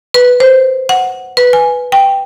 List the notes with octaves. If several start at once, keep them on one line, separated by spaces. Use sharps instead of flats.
B4
C5
F#5
B4
G#5
G5